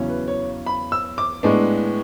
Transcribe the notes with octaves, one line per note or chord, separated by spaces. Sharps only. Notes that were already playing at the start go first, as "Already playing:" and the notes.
Already playing: E2 C#3 F#3 C#4 E4
B4
C#5
B5
E6
D6
A2 G#3 B3 D4